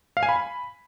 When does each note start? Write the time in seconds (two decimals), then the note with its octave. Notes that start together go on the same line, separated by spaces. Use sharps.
0.17 F5
0.23 G#5
0.29 B5